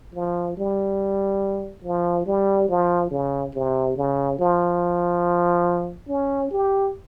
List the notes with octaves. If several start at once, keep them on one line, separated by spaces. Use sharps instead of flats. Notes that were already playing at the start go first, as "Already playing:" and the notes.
F3
G3
F3
G3
F3
C#3
C3
C#3
F3
C#4
G4